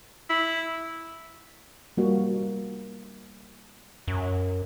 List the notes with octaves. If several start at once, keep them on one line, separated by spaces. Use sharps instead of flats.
E4
G3 A#3 F#4
F#2